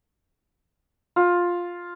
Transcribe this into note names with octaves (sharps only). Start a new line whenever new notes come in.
F4